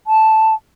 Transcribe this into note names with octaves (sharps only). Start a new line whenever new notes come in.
A5